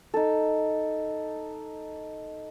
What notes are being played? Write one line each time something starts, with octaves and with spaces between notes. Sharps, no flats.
D#4 A4